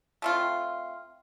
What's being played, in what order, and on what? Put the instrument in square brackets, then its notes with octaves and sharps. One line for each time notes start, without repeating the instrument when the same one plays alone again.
[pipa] A3 C4 F4